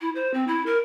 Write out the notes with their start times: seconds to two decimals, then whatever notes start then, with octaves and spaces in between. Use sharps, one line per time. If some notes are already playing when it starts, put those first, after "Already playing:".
0.01 E4
0.15 C5
0.34 C4
0.47 E4
0.66 A#4